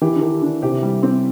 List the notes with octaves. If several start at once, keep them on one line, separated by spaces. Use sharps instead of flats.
E3 G4
D3
D#3 G4
D3 D4
C3 G4
G3
C4